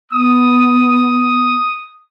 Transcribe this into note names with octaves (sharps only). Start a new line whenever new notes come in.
B3 D#6